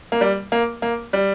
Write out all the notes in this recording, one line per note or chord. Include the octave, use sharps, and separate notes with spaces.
A#3
G3
A#3
A#3
G3